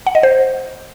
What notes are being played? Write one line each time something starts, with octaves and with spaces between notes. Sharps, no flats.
F#5
D#5
C5